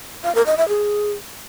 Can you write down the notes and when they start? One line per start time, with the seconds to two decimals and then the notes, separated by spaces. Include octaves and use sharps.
0.24 F5
0.35 A#4
0.46 D#5
0.57 E5
0.69 G#4